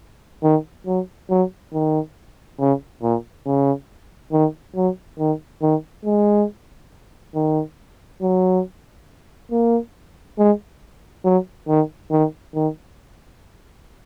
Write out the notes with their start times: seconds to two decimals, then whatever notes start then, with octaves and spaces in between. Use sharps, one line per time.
0.43 D#3
0.86 F#3
1.30 F#3
1.73 D#3
2.60 C#3
3.02 A#2
3.46 C#3
4.32 D#3
4.75 F#3
5.19 D#3
5.62 D#3
6.05 G#3
7.35 D#3
8.22 F#3
9.51 A#3
10.38 G#3
11.24 F#3
11.68 D#3
12.11 D#3
12.54 D#3